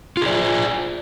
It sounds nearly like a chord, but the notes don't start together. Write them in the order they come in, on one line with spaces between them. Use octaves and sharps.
F4 G#4 D5